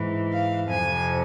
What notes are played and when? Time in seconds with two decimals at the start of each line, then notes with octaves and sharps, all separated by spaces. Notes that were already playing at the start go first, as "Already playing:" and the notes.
Already playing: G#2 E3
0.31 F5
0.69 F2 C3 F3 G#5